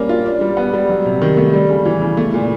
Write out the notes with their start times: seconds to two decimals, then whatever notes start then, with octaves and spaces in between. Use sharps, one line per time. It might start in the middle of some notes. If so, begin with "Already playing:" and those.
Already playing: G3 A#3 C#4
0.09 F4
0.26 D4
0.41 G3
0.57 B3
0.74 G3
0.89 F#3
1.05 C3
1.22 D#3
1.37 A3
1.53 G3
1.69 C#3
1.85 E3
2.02 C#3
2.17 A3
2.34 A#2